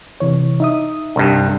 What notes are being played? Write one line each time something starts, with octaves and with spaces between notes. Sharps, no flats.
C3 E3 C#5
D#4 E5 D#6
C2 G2